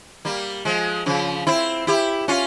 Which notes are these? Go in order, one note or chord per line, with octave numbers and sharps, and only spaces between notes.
G3 A#3
F3 G#3
C#3 F3
C4 E4
E4 G4
C#4 F4